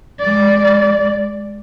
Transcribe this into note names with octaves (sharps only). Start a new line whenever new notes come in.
G#3 D5